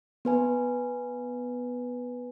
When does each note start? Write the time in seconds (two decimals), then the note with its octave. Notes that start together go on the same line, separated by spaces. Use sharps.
0.25 B3 B4 G#5